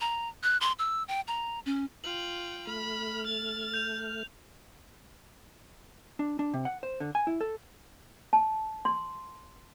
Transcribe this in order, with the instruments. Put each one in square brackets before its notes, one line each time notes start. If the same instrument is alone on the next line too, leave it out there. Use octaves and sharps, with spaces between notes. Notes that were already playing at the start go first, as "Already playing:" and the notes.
[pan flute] A#5
F#6
C6
E6
G5
A#5
C#4
[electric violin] F4 G5 [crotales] F#7
[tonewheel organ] A3 F6 [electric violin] B5
[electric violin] A6
[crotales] G6 F7
[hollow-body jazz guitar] D4
D4
C3
F#5
C5
D3
G#5
E4
A4
[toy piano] A5
C6